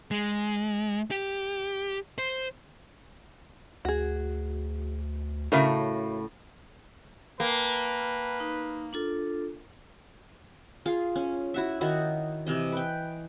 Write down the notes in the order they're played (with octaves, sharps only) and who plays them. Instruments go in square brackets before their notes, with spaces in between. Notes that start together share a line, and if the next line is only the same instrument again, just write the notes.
[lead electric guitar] G#3
G4
C5
[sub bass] D2 [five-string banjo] F#4 G#4
[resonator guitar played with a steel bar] A2 C#3 [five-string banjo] F#4 A#4 E5
[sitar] A#3 [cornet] B4 [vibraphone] G5 A5
[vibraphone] D#4
D4 F4 A4
[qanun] F4 G#4 F5
C#4
E4 F#4 E5
D#3 D#4 E4 F#4
C3 E3 D#5
B4 G5